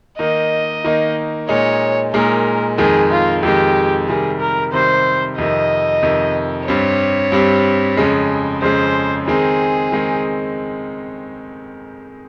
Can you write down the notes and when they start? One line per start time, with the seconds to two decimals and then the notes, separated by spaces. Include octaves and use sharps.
0.19 D#3 A#3 D#4 D#5
0.84 D#3 A#3 D#4
1.49 A#2 G#3 D#4 C#5
2.14 A#2 G#3 D#4 A#4
2.78 F2 D#3 G#3 G#4
3.11 F4
3.43 F2 D#3 G#3 G4
4.08 C3 D#3 G3 G#4
4.40 A#4
4.72 C3 D#3 G3 C5
5.38 F2 C3 D#3 D#5
6.03 F2 C3 D#3
6.67 G2 G3 C4 C#5
7.32 G2 G3 C4
7.97 F2 C#3 G#3
8.62 F2 C#3 G#3 C5
9.27 D#3 G#3 C4 D#4 G#4
9.92 D#3 G#3 C4 D#4